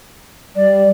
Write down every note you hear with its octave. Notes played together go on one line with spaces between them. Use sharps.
G3 D5